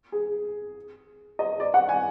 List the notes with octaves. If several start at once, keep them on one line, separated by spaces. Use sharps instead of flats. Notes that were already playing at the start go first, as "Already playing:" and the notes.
G#4
D#5
D5
F#5
G#5